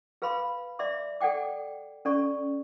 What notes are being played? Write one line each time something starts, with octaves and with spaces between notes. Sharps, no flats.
G#4 B4 F5 B5 C6
D5 E5 C6 D6
A4 D5 F#5 G5 D6
C#4 A4 D5 C#6